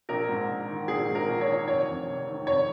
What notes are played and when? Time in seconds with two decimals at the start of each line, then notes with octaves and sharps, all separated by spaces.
0.09 A#1 A#4
0.29 G#2
0.49 A#1
0.68 D#3
0.88 A#1 G#4
1.08 G#2
1.15 A#4
1.28 A#1
1.41 C#5
1.48 D#3
1.68 F1 C#5
1.87 F2
2.07 F1
2.27 D#3
2.47 F1 C#5